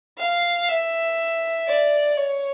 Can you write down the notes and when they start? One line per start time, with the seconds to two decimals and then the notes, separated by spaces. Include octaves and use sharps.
0.18 F5
0.69 E5
1.68 D5
2.17 C#5